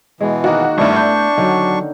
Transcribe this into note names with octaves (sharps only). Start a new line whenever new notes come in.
B2 E3 G#3
D#3 A#3 D#4 F#4
G#1 G2 A3 B3 D4 E4 E5 C#6
G6
D3 D#3 F#3 C#4